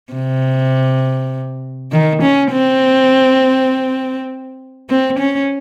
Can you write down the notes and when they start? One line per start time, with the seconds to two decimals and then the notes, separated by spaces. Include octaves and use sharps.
0.13 C3
1.92 D#3
2.22 C#4
2.51 C4
4.89 C4
5.19 C#4